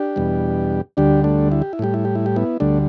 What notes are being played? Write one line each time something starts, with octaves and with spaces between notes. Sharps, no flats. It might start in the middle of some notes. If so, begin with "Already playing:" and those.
Already playing: D4 G4
E2 B2 G3
D2 D3 G3 D4 G4
A3 D4
E4
G4
E4
A2 G3 G4
E4
G4
E4
G4
B3 E4
D2 D3 G3 A3 D4